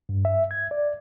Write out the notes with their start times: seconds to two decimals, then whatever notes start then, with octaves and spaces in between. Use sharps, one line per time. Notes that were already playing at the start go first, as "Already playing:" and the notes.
0.09 G2
0.25 E5
0.51 G#6
0.71 D5